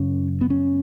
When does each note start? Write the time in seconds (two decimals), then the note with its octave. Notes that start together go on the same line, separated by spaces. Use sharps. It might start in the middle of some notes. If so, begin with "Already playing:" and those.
Already playing: F#2 C#3 C#4
0.41 B3
0.50 C#4